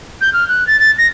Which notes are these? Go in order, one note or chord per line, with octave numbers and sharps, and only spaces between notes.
G6
F6
F#6
A6
A6
A#6